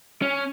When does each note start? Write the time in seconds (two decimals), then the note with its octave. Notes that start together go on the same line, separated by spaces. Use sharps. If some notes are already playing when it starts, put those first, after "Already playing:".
0.22 C#4